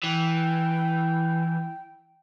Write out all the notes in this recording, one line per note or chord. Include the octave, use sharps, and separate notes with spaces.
E3 G5